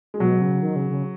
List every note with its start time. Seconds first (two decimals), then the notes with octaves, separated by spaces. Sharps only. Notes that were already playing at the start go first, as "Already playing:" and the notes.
0.14 G#3
0.20 B2 F#3
0.41 C#3
0.62 D#3
0.76 C#3
0.90 C#3